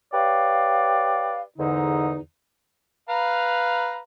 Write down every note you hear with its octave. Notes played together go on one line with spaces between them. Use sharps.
G4 B4 C#5 D5 F5
E2 G#2 D3 D#4
B4 F5 A#5